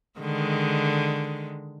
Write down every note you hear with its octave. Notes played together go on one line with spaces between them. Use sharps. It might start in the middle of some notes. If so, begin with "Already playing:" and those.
D3 D#3 G#3